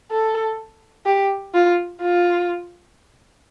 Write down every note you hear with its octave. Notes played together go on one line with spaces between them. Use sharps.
A4
G4
F4
F4